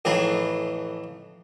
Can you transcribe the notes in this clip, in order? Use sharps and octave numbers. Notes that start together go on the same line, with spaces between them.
F2 A2 E3 D#4 G#4